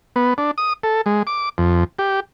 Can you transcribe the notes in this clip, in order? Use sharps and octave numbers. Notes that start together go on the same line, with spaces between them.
B3
D4
D#6
A4
G#3
D6
F2
G4